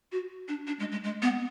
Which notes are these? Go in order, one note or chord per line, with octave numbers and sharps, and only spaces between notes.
F#4
D4
D4
G#3
G#3
G#3
B3